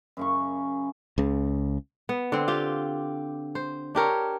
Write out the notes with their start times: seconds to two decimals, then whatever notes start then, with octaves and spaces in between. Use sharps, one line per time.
0.17 F#2 C#3 C#6
1.18 C#2 C#3
2.09 B3
2.32 D3 C4
2.48 F4 G4
3.55 C5
3.95 D4 G4 A#4 C#5